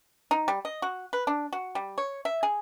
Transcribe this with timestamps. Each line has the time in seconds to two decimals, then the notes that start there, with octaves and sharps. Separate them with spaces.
0.31 D#4
0.48 G3
0.65 D#5
0.82 F#4
1.13 B4
1.27 D4
1.53 F#4
1.75 G3
1.98 C#5
2.25 E5
2.43 G#4